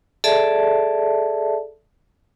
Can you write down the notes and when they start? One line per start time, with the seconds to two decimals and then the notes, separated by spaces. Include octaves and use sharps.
0.24 G#4 A4 D5 E5 A5